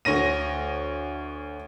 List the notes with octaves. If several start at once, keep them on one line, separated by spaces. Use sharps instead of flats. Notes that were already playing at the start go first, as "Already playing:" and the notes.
D2 C#5 A#6 D#7